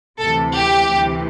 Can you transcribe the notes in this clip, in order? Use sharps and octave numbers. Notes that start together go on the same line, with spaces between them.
D2 C3 E3 A4
G4
D2 C3 E3